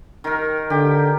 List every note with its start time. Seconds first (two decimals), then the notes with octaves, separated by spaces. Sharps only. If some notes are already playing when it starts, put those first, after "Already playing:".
0.24 D#3 A#4
0.70 D3 G4